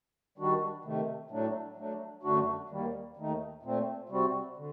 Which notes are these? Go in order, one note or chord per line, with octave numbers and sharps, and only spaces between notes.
D#3 G3 D4 F#4
C3 D#3 A3
A2 F#3 A3 D4
F#3 A3 D4
F#2 D3 A3 D4 F#4
D#2 D#3 G3 A#3
D#2 D#3 A3 D#4
A#2 A3 C4
C3 G3 C4 F#4
D3